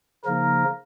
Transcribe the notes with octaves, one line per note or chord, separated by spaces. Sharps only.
C#3 F3 A#3 D#4 A#4